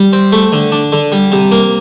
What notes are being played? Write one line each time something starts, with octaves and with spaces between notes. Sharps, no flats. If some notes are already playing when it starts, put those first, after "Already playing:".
Already playing: G3
C4
A3
D3
D4
D3
G3
C3
A#3